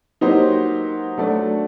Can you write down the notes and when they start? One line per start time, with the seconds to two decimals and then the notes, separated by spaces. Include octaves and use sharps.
0.21 F#3 A#3 D#4 G4 C5
1.17 F#3 A3 D4 A4 D5